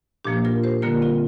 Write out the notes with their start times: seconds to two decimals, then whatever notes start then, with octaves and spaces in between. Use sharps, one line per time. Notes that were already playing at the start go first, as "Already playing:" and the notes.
0.25 A#2 F3 A#3 D4 G4
0.45 F4 A#4
0.63 G4 C5
0.82 D3 G3 A#3 F4 A#4
1.02 C4 F4